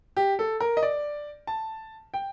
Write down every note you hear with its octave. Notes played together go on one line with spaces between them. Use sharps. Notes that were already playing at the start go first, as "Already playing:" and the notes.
G4
A4
A#4
D#5
D5
A5
G5